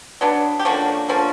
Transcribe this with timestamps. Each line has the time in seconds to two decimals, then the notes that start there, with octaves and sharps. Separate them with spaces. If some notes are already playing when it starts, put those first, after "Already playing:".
0.21 F#3 B3 D4
0.60 G4
0.65 D3 F3 A#3 C#4 F#4
1.09 D3 F3 A#3 C#4